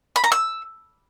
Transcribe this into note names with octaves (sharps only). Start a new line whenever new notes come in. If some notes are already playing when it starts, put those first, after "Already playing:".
B5
A#5
E6